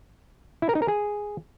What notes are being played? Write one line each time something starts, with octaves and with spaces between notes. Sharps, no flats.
E4
A#4
D#4
A#4
G#4